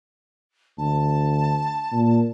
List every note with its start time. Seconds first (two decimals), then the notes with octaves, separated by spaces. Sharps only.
0.78 D2 A5
1.92 A#2